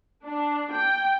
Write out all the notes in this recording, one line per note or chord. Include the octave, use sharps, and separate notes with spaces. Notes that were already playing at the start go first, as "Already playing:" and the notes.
D4
G5